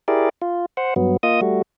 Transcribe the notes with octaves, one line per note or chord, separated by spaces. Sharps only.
E4 G4 G#4 A#4 D5
F4
C5 F#5
G2 F#3 B3
A#3 F4 D#5 D#6
G3 A3 F#4